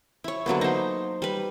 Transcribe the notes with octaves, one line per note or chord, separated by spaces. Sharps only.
E4 C#5
D3 F#3 A#3 B3
D#4 C5
G3 B4